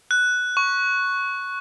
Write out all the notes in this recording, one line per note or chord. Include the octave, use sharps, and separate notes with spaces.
F#6
C#6